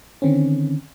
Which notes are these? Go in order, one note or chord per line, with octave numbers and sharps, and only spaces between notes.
D3 D#3 C4 C#4